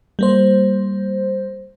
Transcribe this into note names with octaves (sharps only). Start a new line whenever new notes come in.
G3 A#3 C5